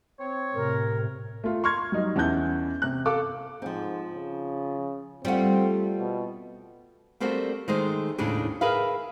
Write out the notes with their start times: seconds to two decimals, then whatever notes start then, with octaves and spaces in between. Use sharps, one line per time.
0.19 C4 C#5
0.54 A2 C3 A#4
1.44 A3 F4
1.64 C6 C#6 F6 G#6
1.92 F#3 G3 D#4
2.16 E2 C#4 E4 A5 F#6 G6
2.82 C3 F#6
3.06 A4 F5 D6
3.62 G#2 F3 C4
4.15 C#3
5.25 G3 A3 C4 F4 F5 F#5
5.99 B2
7.20 G3 A3 A#3 C4 F#4 C5
7.68 D#3 G#3 A3 C5
8.18 D#2 A2 C#3 D4
8.61 G#4 A#4 B4 E5 F5